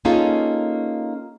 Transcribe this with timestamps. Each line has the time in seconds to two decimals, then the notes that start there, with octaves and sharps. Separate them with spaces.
0.05 A#3 C#4 D#4 F4 G#4 A4